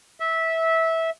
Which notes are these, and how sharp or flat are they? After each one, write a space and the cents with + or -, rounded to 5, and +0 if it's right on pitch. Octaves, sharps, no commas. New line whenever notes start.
E5 -15